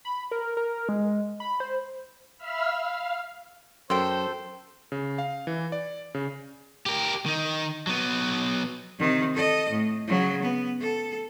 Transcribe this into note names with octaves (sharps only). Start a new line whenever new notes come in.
B5
A#4
A#4
G#3
B5
C5
E5 F5 B5 E6 F6
F5
F#2 A4 C5 G5 C6
C#3
F5
E3
D5
C#3
G4 A#4
D#3 D#4
F#3 B3
C3 D#3
A4 D#5
A2
C#3 F#3
B3
A4